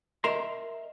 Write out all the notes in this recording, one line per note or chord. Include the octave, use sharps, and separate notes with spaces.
A#4 D#5 E5 A#5 C6